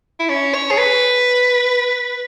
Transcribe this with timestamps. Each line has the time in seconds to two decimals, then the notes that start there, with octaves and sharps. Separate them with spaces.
0.20 E4
0.29 C#4
0.54 C#5
0.71 G#4
0.78 B4